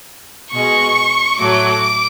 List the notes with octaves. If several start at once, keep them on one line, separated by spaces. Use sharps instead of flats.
B2 G#3 C#6
A2 F#3 A3 D6